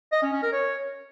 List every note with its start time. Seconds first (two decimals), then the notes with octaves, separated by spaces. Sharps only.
0.12 D#5
0.22 C#4
0.32 C#4
0.42 A#4
0.52 C#5